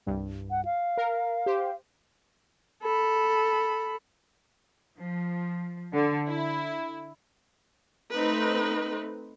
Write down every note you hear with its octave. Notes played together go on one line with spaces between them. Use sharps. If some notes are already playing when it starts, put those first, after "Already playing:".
C2 G2
F#5
F5
A#4
G4 C5
A4 B5
F3
D3
E4
A3 C4 D#4 B4